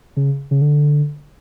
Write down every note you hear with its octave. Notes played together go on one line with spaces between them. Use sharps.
C#3
C#3
D3